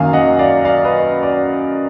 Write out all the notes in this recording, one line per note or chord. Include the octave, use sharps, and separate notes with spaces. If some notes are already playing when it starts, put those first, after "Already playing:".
Already playing: F#2 D#3 F#3 A#3 F5 G#5
D#5 F#5
D5 F5
D5 F5
B4 D#5
D5